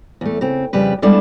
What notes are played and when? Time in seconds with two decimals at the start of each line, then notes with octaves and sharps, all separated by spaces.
0.21 E2 A3
0.41 C#3 C4
0.73 F2 C#3 G3 B4
1.02 G3 G#3 B3 D4 E4 A4